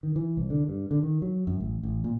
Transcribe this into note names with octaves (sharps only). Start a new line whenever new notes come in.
D#3
E3
C2
D3
G2
D3
D#3
F#3
F#2
A1
A1
A#2